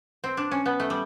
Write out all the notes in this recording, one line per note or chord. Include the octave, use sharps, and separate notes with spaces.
C4
D4
C#4
B3
A3
G3